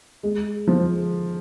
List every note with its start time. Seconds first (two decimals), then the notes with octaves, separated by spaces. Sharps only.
0.23 G#3
0.67 F3